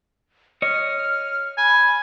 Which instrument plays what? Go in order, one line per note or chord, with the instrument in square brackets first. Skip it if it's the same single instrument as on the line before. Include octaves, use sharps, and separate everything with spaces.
[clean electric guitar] C#5 D#5 [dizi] F6
[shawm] G#5 [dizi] B5